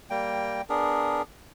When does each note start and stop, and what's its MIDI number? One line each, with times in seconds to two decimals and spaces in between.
0.10 0.62 55
0.10 0.62 58
0.10 0.62 79
0.69 1.22 59
0.69 1.22 62
0.69 1.22 68
0.69 1.22 70